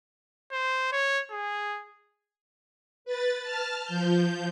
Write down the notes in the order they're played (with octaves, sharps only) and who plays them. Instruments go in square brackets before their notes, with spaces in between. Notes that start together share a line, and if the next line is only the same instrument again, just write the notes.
[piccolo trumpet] C5
C#5
G#4
[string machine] B4 A6
A5 F6
F3 G6